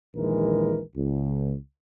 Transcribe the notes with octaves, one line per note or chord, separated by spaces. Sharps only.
A#1 D#2 D#3 E3 G#3 A#4
C#2